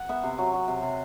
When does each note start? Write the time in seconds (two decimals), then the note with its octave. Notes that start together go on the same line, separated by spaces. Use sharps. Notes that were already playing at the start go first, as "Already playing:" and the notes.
Already playing: F#5
0.09 B3 E5
0.23 C3
0.38 F#3
0.54 F#3
0.68 C3
0.82 C3